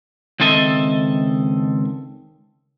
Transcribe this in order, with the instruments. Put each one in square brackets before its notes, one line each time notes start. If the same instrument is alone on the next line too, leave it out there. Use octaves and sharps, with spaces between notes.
[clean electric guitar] C#2 D#3 C4 A4 D#5 E5